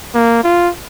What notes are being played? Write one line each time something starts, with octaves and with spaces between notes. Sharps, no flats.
A#3
F4